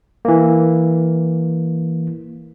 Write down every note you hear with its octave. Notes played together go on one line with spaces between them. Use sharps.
E3 A#3